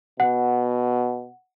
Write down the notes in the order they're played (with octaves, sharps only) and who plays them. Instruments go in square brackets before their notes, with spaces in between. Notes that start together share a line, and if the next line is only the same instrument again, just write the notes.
[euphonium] B2 [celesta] F#5